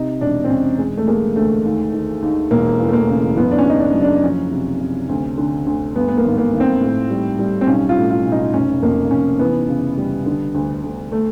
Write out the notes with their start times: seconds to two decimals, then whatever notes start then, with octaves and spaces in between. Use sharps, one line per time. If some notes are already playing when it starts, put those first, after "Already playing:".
Already playing: C3 D#4
0.21 E1 D4
0.44 C4
0.49 E1 C#4
0.79 G#3
0.97 A3
1.07 G#3 A#3
1.36 D2 A3
1.65 D#2
1.93 D#3
2.22 D#2
2.51 E1 A#3
2.79 E3
2.88 A3
2.93 A#3
3.08 C#3
3.37 F#1 B3
3.51 D4
3.58 C#4
3.66 F#1 D#4
3.80 D4
3.94 F#3
4.02 D4
4.23 F3 C#4
4.52 C3
4.80 C3
5.09 D2
5.38 D3
5.66 D2
5.95 G2 B3
6.08 B3
6.17 A#3
6.24 G#1
6.38 A#3
6.53 G#1
6.60 C4
6.81 A2
7.10 G3
7.39 G3
7.61 C4
7.67 B1 C#4
7.89 F4
7.97 A2
8.11 F4
8.25 B1
8.32 D#4
8.54 F1 C#4
8.82 F2 A#3
9.11 F1 C#4
9.39 E3 B3
9.68 C#3
9.97 G3
10.26 D3
10.54 D2
10.83 D2
11.12 A3